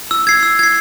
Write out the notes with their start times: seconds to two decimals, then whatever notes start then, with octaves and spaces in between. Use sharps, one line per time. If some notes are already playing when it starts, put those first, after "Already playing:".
0.11 E6
0.27 G#6 C7
0.43 E6
0.59 G#6 C7